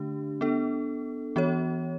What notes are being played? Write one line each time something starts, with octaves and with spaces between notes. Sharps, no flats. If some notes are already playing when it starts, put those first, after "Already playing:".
Already playing: D3 A3 D4 G4
B3 D4 A4
E3 B3 F#4 C#5